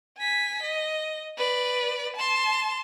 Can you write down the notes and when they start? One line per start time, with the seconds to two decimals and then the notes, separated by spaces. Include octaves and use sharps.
0.18 G#5 B6
0.63 D#5
1.37 B4 D5
2.16 A5 C6